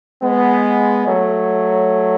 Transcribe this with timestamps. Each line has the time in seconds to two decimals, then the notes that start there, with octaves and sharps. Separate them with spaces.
0.22 G#3 B3
1.05 F#3 A3